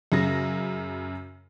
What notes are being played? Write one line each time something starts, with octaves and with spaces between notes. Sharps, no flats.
F#2 C#3 A#6